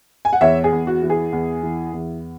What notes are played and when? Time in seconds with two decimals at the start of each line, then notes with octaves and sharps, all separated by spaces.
0.25 G#5
0.33 F#5
0.41 E2 C#5 E5
0.64 G#4
0.72 E2
0.87 F#4
1.02 E3
1.10 G#4
1.33 E2
1.62 E3
1.93 E2